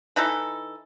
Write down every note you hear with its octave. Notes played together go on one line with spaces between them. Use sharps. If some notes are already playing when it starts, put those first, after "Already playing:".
E3 D#4 E4 A4